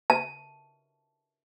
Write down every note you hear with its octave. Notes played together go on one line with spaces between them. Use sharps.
A5